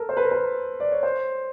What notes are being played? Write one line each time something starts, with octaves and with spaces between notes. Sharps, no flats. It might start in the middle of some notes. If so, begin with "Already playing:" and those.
Already playing: A4 A#4
C5
B4
A#4
B4
D5
C#5
C5